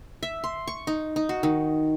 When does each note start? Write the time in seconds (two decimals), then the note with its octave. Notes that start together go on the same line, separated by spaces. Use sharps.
0.23 E5
0.44 C6
0.68 C#6
0.87 D#4
1.16 D#4
1.29 F#4
1.43 D#3